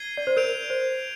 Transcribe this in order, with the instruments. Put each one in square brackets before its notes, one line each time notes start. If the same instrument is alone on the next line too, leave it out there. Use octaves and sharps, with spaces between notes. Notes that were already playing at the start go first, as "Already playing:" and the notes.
Already playing: [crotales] G#6 C7 D#7 G7
[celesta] D5
C5
[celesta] A#4 [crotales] G6 D7 F7
[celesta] C5